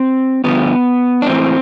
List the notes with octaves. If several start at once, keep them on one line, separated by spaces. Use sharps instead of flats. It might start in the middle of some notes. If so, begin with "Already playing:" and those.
Already playing: C4
G2 D3 F3 B3
D4
A2 E3 C4